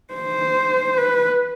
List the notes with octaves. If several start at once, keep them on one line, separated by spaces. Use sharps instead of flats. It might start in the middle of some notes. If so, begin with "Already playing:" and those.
C5
B4